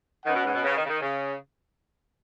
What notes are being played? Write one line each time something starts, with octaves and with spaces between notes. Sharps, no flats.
D#3 C#4 B4 F#5
B2
G#2
B2
C#3
D#3
C#3
D#3
C#3